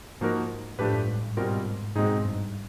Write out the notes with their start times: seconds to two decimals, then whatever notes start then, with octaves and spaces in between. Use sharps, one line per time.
0.21 G#2 F3 A#3 D#4 F#4 A#4
0.79 A2 F3 A3 D4 G4 B4
0.93 G2
1.08 G#2
1.23 G2
1.37 G#2 B2 G3 C4 F4 A#4
1.95 G#2 B2 G#3 C4 D#4 G#4
2.25 G2